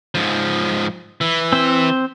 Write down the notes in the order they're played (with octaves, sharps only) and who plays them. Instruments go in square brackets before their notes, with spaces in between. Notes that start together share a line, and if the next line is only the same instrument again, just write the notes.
[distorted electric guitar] G#2 F3
E3
[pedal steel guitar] C4 C5